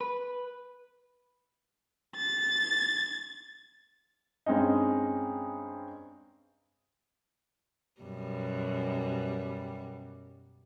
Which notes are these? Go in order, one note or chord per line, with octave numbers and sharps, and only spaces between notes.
B4
A6
G2 G#3 C4 C#4 D#4
F#2 B2 G3